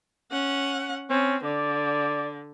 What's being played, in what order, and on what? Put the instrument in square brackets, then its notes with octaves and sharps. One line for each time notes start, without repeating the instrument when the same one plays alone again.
[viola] C#4 F#5
[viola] C4 [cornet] C#4
[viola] D3 [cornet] D5